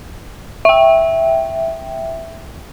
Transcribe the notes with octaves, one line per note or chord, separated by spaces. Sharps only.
E5 G5